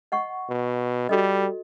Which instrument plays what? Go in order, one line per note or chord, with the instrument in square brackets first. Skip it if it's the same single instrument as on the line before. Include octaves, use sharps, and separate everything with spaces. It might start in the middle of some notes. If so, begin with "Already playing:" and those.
[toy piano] D#5 F#5 C#6
[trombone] B2
[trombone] G3 [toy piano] F#4 A4 D#5